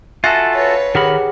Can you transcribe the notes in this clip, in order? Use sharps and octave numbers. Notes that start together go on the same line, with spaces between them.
F4 F#4 A4 E5 G#5 F#6
B4 C#5
D#3 G4 G#4 A#4 F#5 B5